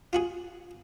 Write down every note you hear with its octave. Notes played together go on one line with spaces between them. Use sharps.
F4 F#4 G#4